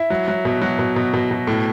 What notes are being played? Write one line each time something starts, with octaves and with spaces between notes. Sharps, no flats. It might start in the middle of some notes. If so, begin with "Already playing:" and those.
Already playing: E4
F#3
F#3
B2
F#3
B2
B2
B2
B2
A2